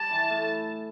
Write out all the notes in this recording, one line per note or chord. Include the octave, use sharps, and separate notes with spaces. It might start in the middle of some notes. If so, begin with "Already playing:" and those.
Already playing: G3 A5
E3
A2